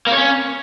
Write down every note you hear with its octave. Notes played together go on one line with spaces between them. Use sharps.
A#3
C#5
C#4